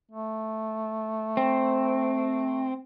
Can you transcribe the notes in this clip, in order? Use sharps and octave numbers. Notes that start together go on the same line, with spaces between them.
A3
C4